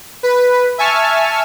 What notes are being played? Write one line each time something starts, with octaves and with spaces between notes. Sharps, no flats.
B4
E5 G#5 A5 C#6 F6